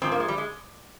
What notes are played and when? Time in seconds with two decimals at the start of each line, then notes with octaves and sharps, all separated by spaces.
0.02 G#2 F3 C4
0.12 A#3
0.20 G#3
0.28 G3
0.38 G#3